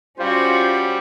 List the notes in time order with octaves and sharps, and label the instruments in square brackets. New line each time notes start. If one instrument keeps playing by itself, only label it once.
[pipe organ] G3 [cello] C#4 F#4 [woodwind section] F4 C5